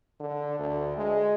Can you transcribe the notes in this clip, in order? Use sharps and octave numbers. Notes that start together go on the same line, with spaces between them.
D3
D2
G#3